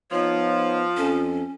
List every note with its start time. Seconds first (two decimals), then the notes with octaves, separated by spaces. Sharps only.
0.11 F3 B3 D#4 C#5
0.97 F2 C#4 A4